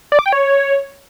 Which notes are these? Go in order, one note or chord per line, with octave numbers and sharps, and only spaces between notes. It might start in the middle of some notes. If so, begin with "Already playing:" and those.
D5
D6
G5
C#5